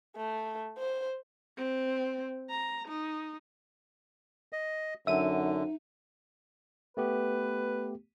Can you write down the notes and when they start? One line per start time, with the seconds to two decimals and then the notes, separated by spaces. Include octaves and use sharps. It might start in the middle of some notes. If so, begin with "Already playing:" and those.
0.17 A3
0.78 C5
1.57 C4
2.50 A#5
2.88 D#4
4.53 D#5
5.07 F#2 D3 D#4 E5 D#7
6.97 A3 B3 G4 B4